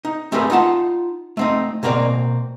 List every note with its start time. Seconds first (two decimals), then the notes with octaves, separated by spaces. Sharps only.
0.05 D#4
0.32 A3 C4 G4 G#4 A#4 B4
0.50 D#4 F4 F#5 A5
1.37 A3 C4 D#4
1.83 B2 A#3 C4 A#4 D5